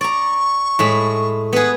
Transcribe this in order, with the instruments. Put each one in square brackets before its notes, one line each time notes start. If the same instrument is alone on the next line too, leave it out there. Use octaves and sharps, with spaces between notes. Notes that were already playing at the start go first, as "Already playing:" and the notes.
[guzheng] D5 A#5 [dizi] C#6
[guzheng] A2 G#3 B5
[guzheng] B3 G#4 [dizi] B4